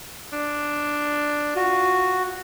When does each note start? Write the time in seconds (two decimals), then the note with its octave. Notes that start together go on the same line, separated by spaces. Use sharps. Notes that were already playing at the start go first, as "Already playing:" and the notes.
0.33 D4
1.56 F4 F#4